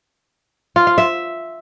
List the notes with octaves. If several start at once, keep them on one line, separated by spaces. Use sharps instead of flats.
F4
F5
E5